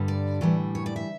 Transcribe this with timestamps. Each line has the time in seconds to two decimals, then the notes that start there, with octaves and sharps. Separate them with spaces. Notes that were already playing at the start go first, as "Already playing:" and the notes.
Already playing: G2 D3 G3
0.08 D5
0.41 A2 E3 G3
0.75 C#5
0.86 D5
0.96 E5